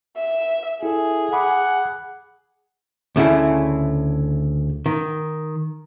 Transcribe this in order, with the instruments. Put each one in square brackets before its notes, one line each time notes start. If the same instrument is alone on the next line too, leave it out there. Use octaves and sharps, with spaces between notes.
[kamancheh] E5
[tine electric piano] E4 A4 E5 [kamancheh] G#4
[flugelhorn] F#5 [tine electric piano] G#5 B5 D6
[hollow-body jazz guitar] D2 C#3 A3 E4
D#3